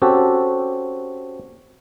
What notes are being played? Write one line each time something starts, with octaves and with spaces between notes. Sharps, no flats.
C4 C#4 F#4 G4 A4